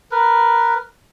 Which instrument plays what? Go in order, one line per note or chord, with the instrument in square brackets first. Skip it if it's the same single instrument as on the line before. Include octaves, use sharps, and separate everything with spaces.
[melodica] A#4 B4